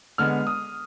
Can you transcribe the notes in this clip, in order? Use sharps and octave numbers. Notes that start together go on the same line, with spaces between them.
D3 G#3 B3 F6
D#6